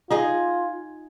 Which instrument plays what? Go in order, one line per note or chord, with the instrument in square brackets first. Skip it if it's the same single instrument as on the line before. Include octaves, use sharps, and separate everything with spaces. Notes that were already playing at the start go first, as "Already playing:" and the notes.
[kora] D#4 G#4 D#5 [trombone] F4